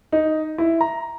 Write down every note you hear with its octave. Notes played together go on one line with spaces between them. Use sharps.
D#4
E4
A#5